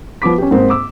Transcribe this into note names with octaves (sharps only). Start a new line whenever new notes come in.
F3 B3 D6 B6
C#4 G4
G#2 A#3 C4
D6 E6